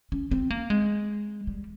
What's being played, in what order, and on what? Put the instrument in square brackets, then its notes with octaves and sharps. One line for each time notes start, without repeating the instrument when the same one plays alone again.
[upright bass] C#4
C4
A#3
G#3
G3